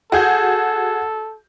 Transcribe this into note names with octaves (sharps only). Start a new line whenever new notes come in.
F#4 G#4 A4 G6